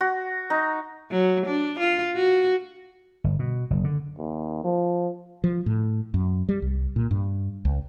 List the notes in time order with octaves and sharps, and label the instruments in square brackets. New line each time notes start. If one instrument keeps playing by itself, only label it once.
[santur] F#4
D#4
[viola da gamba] F#3
D4
F4
F#4
[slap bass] G1
B2
F#1
D3
[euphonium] D#2
F3
[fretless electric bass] F3
A2
F#2
G3
C2
A#2
G2
C#2